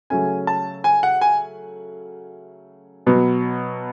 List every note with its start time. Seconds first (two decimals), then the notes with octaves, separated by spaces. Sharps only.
0.10 C#3 F#3 A3 C#4 G#5
0.47 A5
0.84 G#5
1.03 F#5
1.21 G#5
3.07 B2 F#3 B3